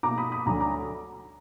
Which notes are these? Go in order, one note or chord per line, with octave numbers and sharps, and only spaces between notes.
B2 A#3 A#5 D6
B5 D#6
B5 D#6
D2 D3 F#3 A#5 D6
A#5 D6